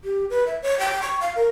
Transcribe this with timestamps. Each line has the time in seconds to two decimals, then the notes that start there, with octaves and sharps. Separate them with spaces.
0.04 G4
0.30 B4
0.47 E5
0.62 C#5
0.80 G5
1.02 C#6
1.21 F5
1.36 A#4